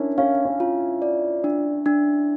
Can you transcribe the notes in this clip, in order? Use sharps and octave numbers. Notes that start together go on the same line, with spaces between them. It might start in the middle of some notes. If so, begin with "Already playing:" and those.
Already playing: C#4 D4 E4 A#4
C#4 F5
C#4
F4
D5
D4
D4